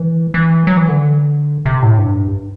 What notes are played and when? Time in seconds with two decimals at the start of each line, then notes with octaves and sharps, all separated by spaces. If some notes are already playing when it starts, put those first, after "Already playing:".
Already playing: E3
0.34 E3
0.67 F#3
0.77 E3
0.89 D3
1.66 C3
1.83 A2
1.98 G2